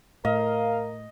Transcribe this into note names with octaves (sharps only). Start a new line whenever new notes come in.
A2 A#4 D#5 F5